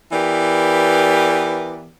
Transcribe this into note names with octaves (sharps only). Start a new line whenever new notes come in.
E3 B3 G4 A#4 D5